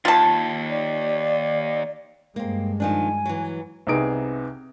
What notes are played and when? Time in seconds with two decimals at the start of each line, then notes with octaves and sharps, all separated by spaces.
0.05 D#2 F4 A5
0.70 D5
2.36 G2 G#3 A#3 C4
2.80 D#3 F3 D4 G#5
3.25 E3 F#3
3.87 C2 C3 B3 D#4 G#4 D7